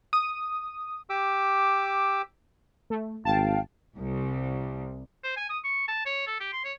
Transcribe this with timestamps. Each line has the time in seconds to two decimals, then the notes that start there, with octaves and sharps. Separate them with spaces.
0.13 D#6
1.10 G4 D6 E6
2.90 A3
3.25 G#1 F5 G5 A5
3.98 C2
5.24 C5
5.37 G#5
5.49 D#6
5.64 C#6
5.88 A5
6.06 C#5
6.27 A4
6.40 G4
6.53 C6
6.65 C#5